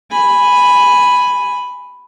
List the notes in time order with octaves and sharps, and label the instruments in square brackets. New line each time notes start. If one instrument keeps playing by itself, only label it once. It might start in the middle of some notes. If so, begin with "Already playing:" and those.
[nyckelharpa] G#5 B5